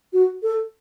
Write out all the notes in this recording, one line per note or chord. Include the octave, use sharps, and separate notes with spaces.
F#4
A4